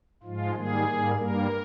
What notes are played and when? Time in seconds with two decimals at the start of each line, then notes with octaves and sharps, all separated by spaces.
0.23 G#2 F3 G#3 F4
0.54 G#2 D#3 G3 A#3 G#4
0.84 G#2 G3 A#3
1.16 G2 G3 A#3 A#4